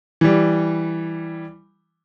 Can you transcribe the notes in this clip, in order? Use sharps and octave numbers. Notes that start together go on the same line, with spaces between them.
E3 G3